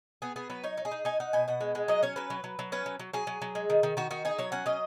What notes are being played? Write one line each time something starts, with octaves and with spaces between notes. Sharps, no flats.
B3 G#4
B3 G#4
F#3 B4
D#4 C#5
D#4
G#4
D#4
D#4 G#5
D#4 F#5
B2 G#5
B2 F#5
G#3
G#3
F#3 D#5
C#4 C#5
F#3 B4
F#3
F#3
F#3
C#4 B4
F#3
F#3
F#3 G#4
F#3
F#3
G#3
D#3
D#3
D#3 F#4
D#3 F#4
D#4 G#4
F#3 C#5
C#4 F#5
F#3 D#5